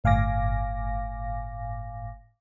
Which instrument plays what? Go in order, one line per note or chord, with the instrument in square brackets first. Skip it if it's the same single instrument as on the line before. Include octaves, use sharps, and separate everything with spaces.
[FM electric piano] G1 A2 F5 G#5 D6 A#6